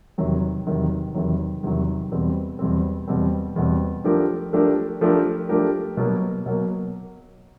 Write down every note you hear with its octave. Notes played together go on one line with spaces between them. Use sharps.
E2 C3 D#3 F#3
E2 C3 D#3 F#3
E2 C3 D#3 F#3
E2 C3 D#3 F#3
E2 B2 G3 C4
E2 B2 G3 C4
E2 B2 G3 C4
E2 B2 G3 C4
F3 A3 D4 G4 A#4
F3 A3 D4 G4 A#4
F3 A3 D4 G4 A#4
F3 A3 D4 G4 A#4
B2 F#3 A#3
B2 F#3 A#3